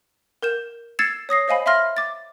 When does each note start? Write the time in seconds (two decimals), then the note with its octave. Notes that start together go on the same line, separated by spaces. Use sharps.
0.42 A#4 G6 E7
0.99 E6 G#6 A6 C7 C#7 E7
1.29 C#5 D#6 A#6 C7
1.48 C5 D#5 F5 G#5 B5
1.66 E5 F5 B5 C6 F6 A#6
1.97 D6 A6